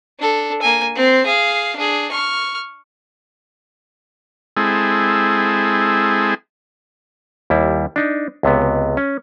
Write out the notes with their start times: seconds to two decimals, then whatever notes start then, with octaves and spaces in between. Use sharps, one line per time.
0.19 D4 A4
0.62 A#3 G#5
0.95 C4 C6
1.26 G#4 F5
1.76 D4 G#4
2.11 C#6 F6
4.57 G#3 C4 E4 G#4 A4
7.50 D#2 G3 E4
7.96 D4 D#4
8.43 C#2 C3 B3
8.97 C#4